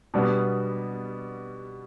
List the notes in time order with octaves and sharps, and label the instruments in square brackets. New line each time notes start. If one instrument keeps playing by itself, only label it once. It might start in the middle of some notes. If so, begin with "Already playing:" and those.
[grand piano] B2 G3 B3 D4 G4